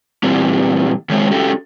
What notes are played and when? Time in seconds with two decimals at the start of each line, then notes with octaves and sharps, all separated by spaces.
0.23 A#2 E3 G3 C4
1.09 D#3 F#3 G#3 C4 G#4 C#5
1.31 C#4 F#4 G4 A4